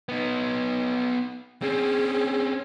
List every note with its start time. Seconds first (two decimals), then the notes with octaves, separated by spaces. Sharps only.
0.09 B3 D#4
1.62 C4 C#4 G#4